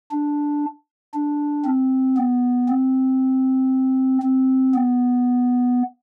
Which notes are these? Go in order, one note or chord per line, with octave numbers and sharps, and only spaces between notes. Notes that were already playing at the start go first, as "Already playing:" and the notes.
D4
D4
C4
B3
C4
C4
B3